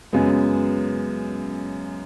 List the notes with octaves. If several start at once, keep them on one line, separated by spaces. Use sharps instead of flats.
F#2 C#3 G#3 B3